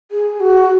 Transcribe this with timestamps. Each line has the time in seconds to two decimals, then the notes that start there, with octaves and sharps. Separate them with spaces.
0.11 G#4
0.40 F#4